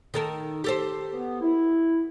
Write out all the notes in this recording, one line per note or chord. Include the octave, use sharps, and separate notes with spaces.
D#3 A4 A#4
G4 A4 C5
B3
E4